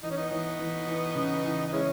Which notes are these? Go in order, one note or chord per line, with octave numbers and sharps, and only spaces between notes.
E3 D#4
C#4
B3 D#4
E3
E3
E3
C#3
E3
D#4
G#3 C#4 E4